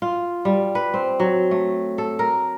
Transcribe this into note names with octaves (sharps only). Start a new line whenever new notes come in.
F4
G3
B4
C4
F#3
A3
A4
A#4